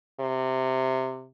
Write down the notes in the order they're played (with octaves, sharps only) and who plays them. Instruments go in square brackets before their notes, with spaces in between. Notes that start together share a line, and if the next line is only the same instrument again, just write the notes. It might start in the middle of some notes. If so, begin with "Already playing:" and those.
[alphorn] C3